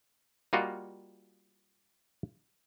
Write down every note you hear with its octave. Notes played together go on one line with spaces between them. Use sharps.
G3 A#3 F4 F#4 D#5